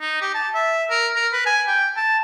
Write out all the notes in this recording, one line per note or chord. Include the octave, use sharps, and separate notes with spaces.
D#4
G4
A5
E5
A#4
A#4
B4
G#5
G5
A5